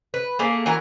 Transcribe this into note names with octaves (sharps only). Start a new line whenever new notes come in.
B4
A3 A#3 G#4
E3 F#4 A#4